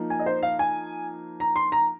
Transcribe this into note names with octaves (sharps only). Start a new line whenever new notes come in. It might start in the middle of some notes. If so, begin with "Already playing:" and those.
Already playing: F3 A#3 D#4
G#5
D#5
C5
F5
G#5
A#5
C6
A#5